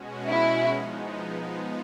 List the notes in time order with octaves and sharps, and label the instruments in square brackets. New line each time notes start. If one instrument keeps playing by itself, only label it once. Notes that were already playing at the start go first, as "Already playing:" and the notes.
Already playing: [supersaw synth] B2 G#3 C#4 F#4
[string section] E4
[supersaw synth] F3 G#3 B3 D#4